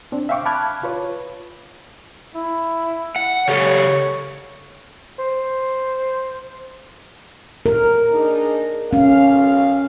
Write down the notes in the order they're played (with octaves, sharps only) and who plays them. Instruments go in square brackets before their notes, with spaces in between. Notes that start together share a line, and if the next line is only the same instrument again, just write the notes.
[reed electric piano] C4 D4
E5 F5 G5 C#6 D6
A5 B5 D6 F6 F#6 G#6
F4 B4 C#5
[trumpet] E4
[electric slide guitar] F#5
[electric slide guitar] C#3 G4 A4 [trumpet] C#5
[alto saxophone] C5
[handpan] A#4
[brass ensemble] D4 D#4 G#4
[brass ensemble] B1 F5 [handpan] C#4